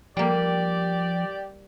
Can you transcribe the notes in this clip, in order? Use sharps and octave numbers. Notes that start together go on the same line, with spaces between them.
F3 G3 A#3 G4 D5